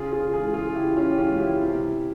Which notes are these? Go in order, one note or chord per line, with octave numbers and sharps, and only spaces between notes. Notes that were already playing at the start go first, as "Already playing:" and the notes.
Already playing: C#3 F4 G#4
F4 G#4
E3 G#3 F4 G#4
F4 G#4
C#3 E4 G4
C#4 F4
G4
E3 G#3 C#4 F4
E4 G4
C3